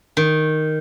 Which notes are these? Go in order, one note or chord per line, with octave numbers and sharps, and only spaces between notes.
D#3